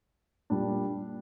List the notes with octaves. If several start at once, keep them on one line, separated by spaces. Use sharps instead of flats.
A#2 G3 D4